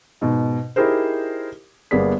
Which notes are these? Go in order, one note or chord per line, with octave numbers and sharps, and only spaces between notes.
G#2 B2
D#4 E4 G4 G#4 A#4 C5
G1 A#3 B3 G#4 D5 B6